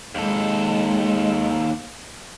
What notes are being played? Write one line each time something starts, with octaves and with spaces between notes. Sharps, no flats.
D#2 G#3 A4